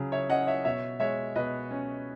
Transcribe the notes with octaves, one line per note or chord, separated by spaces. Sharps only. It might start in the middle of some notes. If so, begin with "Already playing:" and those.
Already playing: C#3 F#3 G#4
C#5 E5
C#4 D#5 F#5
C#5 E5
B2 C#5 E5
G#3 C#5 E5
B2 B4 D#5
C#4